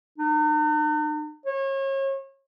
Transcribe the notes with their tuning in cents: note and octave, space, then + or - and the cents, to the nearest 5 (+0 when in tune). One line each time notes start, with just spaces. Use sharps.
D#4 -45
C#5 -35